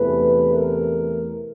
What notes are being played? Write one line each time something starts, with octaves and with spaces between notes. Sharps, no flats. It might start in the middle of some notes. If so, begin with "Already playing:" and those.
Already playing: E2 C3 E3 A3 B4
A#4